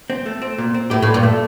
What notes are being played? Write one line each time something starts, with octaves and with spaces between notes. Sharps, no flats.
C4
A3
C4
A#2
C4
A2 G4
A2
A#2
G2
A3